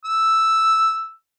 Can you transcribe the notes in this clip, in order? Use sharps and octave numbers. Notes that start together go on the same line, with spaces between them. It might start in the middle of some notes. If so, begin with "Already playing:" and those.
E6